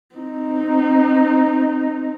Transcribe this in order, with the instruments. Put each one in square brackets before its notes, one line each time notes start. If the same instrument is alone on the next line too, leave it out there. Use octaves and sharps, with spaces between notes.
[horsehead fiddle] C4 D#4